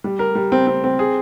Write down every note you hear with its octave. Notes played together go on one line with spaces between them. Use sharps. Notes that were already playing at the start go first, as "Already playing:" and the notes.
G3
A#4
G3
C4
C4
C4
G#4